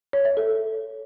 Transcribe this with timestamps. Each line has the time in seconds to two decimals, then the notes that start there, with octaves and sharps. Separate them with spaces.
0.13 C#5
0.25 E5
0.37 A4